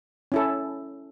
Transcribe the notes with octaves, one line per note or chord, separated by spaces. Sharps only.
C#4 E4 A4